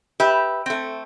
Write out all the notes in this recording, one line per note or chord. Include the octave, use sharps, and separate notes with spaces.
G4 B4 E5
A3 C4